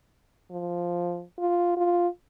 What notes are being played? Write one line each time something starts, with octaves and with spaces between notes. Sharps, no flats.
F3
F4
F4